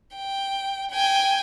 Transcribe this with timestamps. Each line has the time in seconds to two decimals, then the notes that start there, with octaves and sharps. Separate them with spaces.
0.16 G5
0.91 G5 G#5